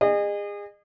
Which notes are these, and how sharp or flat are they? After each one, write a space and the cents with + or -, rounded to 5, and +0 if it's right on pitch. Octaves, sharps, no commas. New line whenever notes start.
G#4 -30 D#5 -35